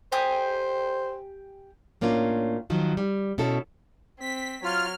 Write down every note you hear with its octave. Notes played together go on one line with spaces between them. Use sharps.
G4 C5 G#5 D#6
A2 A#3 C#4 D4 F4
D#3 F3 F#3
G3
B2 C#4 E4 A4
C4 B6
F#3 F4 F6